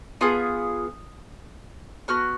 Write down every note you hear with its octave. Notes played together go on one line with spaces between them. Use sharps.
B3 F4 G#4 D#6
B3 F#4 F6